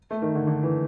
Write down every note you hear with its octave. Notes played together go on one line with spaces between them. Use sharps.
A3
D#3
D3
D3
E3